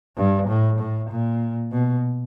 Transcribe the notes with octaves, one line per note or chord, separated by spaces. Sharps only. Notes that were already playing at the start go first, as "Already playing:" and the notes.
G2
A2
A2
A#2
B2